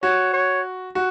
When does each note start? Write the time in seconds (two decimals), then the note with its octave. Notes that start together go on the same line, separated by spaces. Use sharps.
0.03 F#4 C#5
0.33 C#5
0.95 F#4